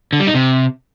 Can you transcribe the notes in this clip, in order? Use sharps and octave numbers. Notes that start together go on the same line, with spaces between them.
D3
G3
D#4
C3